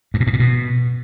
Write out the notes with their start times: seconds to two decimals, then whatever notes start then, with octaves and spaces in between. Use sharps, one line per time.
0.14 G2
0.20 B2
0.27 G#2
0.33 A#2
0.40 B2